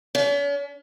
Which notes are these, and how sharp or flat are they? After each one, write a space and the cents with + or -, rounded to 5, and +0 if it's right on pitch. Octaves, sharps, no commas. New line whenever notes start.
C#4 +45